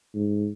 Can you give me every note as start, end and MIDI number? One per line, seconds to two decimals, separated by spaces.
0.15 0.49 44